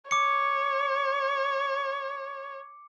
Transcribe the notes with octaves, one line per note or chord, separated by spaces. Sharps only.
C#5 D6 C#7